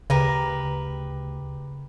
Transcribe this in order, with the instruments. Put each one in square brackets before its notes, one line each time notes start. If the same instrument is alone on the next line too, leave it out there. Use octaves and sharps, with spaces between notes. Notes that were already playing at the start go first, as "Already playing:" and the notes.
[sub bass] D2 [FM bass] C#3 [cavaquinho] G4 A#4 B4